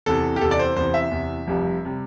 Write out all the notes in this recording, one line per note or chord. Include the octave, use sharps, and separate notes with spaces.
E2 C3 E3 A4
G4
E2 C3 E3 A4
D5
C5
E2 C3 E3 C5
E5
E2 C3 E3
F1 F2 C3 G3
C3 G3